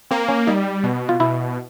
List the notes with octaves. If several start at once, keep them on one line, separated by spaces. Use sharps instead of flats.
A#3 C4
C#4
G3 D#4
B2
F4
B2 E4